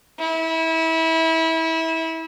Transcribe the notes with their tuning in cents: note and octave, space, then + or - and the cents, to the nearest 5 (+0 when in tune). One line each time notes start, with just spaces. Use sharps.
E4 -25